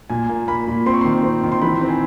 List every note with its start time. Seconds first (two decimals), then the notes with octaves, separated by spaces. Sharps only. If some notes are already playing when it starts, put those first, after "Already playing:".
0.10 A#2 G#5
0.29 A#3
0.48 A#3 B5
0.68 A#2
0.86 C4 C6
0.93 C#6
1.01 D#3 C6
1.23 C4
1.43 D#3
1.52 C6
1.62 E3 B5
1.81 C4
1.89 G#5